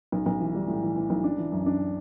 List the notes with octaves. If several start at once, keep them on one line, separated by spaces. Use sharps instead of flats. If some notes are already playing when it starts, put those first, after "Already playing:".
B1
B1
E3
G3
A2
E3
E3
B1
D4
E3
F#2
D4